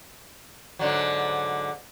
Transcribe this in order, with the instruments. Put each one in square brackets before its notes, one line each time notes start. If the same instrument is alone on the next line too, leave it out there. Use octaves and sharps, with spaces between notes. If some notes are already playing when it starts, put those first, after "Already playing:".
[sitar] G#2 D3 F#3